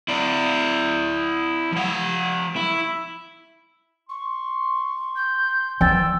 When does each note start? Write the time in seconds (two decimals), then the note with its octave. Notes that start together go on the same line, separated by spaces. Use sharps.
0.08 E4 D5
1.72 F3 F#5
2.56 E4
4.09 C6 C#6
5.15 G6
5.81 E3 F3 G5 E6 A6